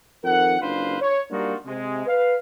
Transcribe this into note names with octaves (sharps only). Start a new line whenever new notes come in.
F2 D#3 A#4 F#5
F#1 D4 F4 B4 C5 F5
C#5
G3 A#3 D4 D#4 F4 F#4
C3 G#3
B4 F5